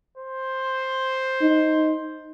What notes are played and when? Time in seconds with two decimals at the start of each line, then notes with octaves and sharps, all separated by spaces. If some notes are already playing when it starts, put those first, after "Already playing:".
0.17 C5
1.42 D#4